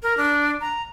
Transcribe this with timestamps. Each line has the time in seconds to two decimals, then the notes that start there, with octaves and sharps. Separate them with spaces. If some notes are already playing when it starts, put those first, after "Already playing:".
0.03 A#4
0.17 D4
0.61 A#5